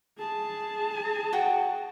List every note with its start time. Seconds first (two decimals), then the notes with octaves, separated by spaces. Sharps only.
0.18 G#4 A5
1.33 F#4 F#5 G5